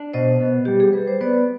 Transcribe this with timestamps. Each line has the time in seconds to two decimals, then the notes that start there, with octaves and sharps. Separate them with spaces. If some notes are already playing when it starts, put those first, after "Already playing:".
Already playing: D4
0.13 B2 C5 D#5
0.41 B3
0.65 G3 G4
0.80 G#4
0.93 G3 B4
1.08 C5
1.21 B3 B4 D5